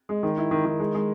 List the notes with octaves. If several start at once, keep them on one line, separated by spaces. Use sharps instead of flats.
G#3
D#3
E4
D#3
D#3
G#3
G#3